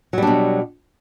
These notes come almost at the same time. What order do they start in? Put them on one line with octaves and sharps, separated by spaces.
F#3 G3 D4 B2